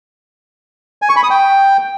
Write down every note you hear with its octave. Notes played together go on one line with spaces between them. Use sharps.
G#5
C#6
B5
D#6
G5